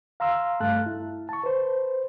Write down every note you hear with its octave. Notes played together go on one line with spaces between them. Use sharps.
F5 A#5 C6 E6
G2 A3 F5 A5 F#6
E4
A5 C#6
B4 C5